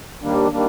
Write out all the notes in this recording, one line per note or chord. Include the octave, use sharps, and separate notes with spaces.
D#2 D#3 G3 A#3 D4
D#3 G3 A#3 D4